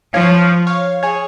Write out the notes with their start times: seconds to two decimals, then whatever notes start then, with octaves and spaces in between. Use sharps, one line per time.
0.13 F3 C#5 F5
0.67 C#5 F5
1.03 G#4 C#5